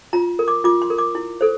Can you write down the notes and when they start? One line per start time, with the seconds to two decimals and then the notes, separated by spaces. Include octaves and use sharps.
0.13 F4 A#5
0.39 A#4
0.48 D6
0.64 F4 D6
0.82 C6
0.90 A#4
0.98 D6
1.15 E4
1.41 A4 C5